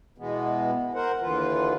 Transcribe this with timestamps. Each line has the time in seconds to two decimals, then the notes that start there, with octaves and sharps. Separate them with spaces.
0.18 B2 E3 G#3 B3
0.95 A#4 C5 F#5
1.21 D#2 D3 E3 F4 B4